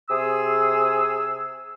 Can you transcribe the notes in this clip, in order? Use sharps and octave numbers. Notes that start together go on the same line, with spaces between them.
C3 G#4 E6